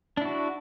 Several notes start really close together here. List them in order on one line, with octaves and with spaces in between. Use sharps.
D4 E4 F#4